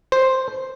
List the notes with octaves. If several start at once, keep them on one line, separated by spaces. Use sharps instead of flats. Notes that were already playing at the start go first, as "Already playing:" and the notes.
C5